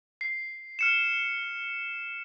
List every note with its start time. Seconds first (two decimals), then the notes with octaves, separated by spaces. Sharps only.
0.21 C7
0.79 F6 C#7 E7